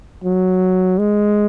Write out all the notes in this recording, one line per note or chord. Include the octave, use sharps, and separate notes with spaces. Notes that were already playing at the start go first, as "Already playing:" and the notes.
F#3
G#3